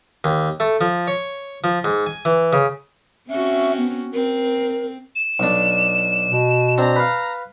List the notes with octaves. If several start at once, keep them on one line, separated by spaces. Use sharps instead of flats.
D#2
A3
F3
C#5
F3
G#2
G#5
E3
C#3
C4 C#4 F#4 E5
B3
C4 A#4
E7
B1 D4
B2
C4 D4 A#5
B4 F5